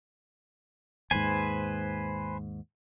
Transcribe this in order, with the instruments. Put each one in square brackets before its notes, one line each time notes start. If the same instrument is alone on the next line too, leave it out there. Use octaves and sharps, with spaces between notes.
[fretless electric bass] D#2 G#2 [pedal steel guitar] B4 C5 G#5